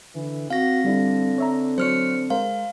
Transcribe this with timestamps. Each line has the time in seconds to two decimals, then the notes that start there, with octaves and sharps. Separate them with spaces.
0.15 D3 E3
0.50 C4 F#4 F5 A#6
0.85 D3 G3 D4 E4
1.38 C#5 E5 A#5
1.78 F#3 C5 C#5 F6 C#7
2.30 G#3 A#4 C5 F5